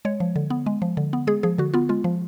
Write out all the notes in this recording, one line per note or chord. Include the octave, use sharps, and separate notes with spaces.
G#3 C#5
F3
D3
B3
G#3
F3
D3
B3
G#3 G#4
F3 G#4
D3 F#4
B3 F4
G#3 F4
F3